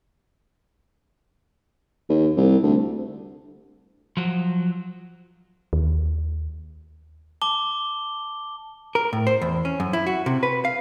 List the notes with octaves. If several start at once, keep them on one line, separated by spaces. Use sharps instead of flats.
D#2
C2
D2
F3 F#3
D#2
A5 D6 G7
A#4
A2
C5
E2
C#4
F#2
E4
F#4
C3
B4
F5